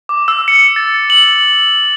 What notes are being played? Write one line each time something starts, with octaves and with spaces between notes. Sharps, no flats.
D6
E6
C#7
A6
F#7